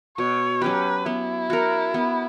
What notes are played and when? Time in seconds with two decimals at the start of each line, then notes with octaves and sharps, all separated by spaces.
0.18 B2 C#5
0.61 F#3 C#4 G4 B4
1.06 B3 E4
1.50 F#4 A#4
1.94 B3